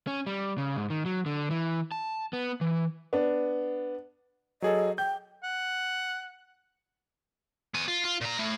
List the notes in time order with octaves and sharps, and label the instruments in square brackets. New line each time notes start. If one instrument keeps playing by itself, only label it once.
[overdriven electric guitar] C#4
G3
C#3
G#2
D#3
F#3
D3
E3
A5
B3
E3
[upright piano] B3 D4
[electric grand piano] F#3 G#4 A4 [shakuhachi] D#5
[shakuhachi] G5 [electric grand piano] G6
[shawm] F#5
[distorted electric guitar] B3 G#5
F4
F4
A#2 A#5
A3 E4